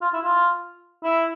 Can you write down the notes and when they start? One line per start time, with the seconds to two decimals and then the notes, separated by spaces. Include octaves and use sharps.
0.02 F4
0.13 E4
0.24 F4
1.04 E4